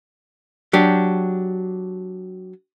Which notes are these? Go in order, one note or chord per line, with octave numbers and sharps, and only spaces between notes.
F#3 D4 G4